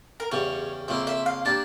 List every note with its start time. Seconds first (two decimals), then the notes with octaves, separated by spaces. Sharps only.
0.20 A#4
0.31 E2 C#3 G3 C#5
0.88 F2 C#3 F3 A#3 E5
1.07 E5
1.26 F5
1.45 G3 A#3 D4 A5